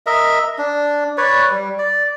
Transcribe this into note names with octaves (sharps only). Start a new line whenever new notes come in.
A#4 D#5 E5
D4
B4 C#5 D5
G3
D5